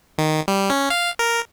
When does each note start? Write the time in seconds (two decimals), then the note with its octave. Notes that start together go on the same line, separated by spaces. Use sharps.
0.18 D#3
0.48 G3
0.70 C#4
0.90 F5
1.19 A#4